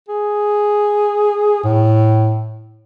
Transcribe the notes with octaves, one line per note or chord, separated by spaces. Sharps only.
G#4
A2